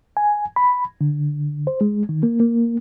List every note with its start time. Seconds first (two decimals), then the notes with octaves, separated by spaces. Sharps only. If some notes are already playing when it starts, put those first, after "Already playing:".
0.17 G#5
0.56 B5
1.01 D3
1.67 C5
1.81 G#3
2.09 D#3
2.23 A#3
2.40 A#3